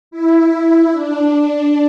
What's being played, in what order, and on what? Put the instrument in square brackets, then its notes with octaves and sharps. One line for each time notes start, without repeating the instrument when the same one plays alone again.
[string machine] E4
D4
D4